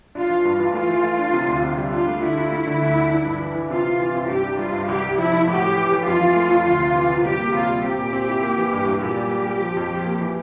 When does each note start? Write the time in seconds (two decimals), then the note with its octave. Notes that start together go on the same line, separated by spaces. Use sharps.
0.15 D4 F4
0.30 E3
0.45 G2
0.60 E3
0.74 A3 F4
0.89 E3
1.04 A3
1.19 D4
1.34 C3
1.48 D2
1.63 C3
1.78 G3
1.93 D4 F4
2.08 A3
2.22 D3 E4
2.37 F4
2.52 A3
2.67 D3
2.81 D2
2.96 D3
3.11 D4
3.26 G2
3.41 E3
3.56 E3
3.70 C3 F4
3.85 C3
4.00 E3
4.14 C3
4.29 G2 G4
4.44 D4
4.58 G3 F4
4.74 G2
4.88 C2 G4
5.03 C2
5.18 F3 E4
5.33 F3
5.47 A2 G4
5.62 A2
5.77 E3
5.92 E3
6.07 F2 F4
6.21 E3
6.36 A3
6.50 F2
6.66 D2
6.80 C3
6.95 E3
7.10 C3
7.25 G3 G4
7.39 A#3
7.55 C3 F4
7.69 G3
7.84 C4 G4
7.99 A#2
8.13 C4
8.28 E4
8.43 A#3
8.58 E3
8.73 G2
8.87 G2
9.02 A#2 G4
9.17 G3
9.31 G3
9.47 G3
9.61 F3
9.77 F2
9.91 F3
10.06 A#3
10.21 E3